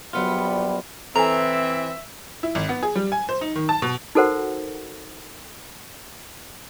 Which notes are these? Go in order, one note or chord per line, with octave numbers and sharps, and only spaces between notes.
A#1 F#3 G3 B3 F4
E3 C4 A4 E5 G#5 A#5
E4
G#1
B3
G#4
G3
G#5
C5
D#4
D#3
A5
B2
D#4 F#4 A4 A#4 C5 F#5